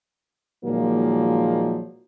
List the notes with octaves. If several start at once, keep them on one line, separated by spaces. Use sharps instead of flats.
A#2 D#3 F3 F#3 G#3 A#3